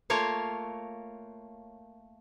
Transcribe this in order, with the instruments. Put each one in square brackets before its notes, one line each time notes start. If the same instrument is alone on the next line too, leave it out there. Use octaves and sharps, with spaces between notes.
[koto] A3 A#3 F4 A#4 C#5 F5